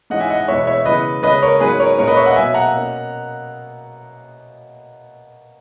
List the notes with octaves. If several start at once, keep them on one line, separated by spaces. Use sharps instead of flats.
G#2 E3 G#3 C#4 D#5 F#5
E5 G#5
D#5 F#5
E2 B2 G#3 B3 C#5 E5
C#5 E5
C#3 E3 G#3 B3 B4 D#5
C#3 G#3 C#4 B4 D#5
A#4 C#5
G#2 F#3 B3 G#4 B4
A#4 C#5
A#2 G#3 C#4 A#4 C#5
B4 D#5
C#5 E5
D#5 F#5
B2 F#3 A#3 E5 G#5
F#5 A#5
B2 A#3 C#4